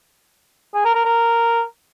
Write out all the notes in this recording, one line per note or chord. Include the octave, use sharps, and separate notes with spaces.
G#4
A#4
A#4
A#4